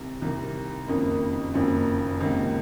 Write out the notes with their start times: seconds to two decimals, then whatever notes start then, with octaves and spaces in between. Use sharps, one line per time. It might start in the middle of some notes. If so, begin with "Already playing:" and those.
Already playing: C2 C3 D#3
0.22 C2 C3 D#3
0.88 F#1 F2 D#3 A#3 C#4
1.54 F#1 F2 D#3 A#3 C#4
2.20 C#2 C3 D#3 A#3